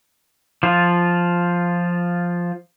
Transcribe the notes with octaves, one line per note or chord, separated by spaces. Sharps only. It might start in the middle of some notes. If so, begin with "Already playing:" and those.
F3 F4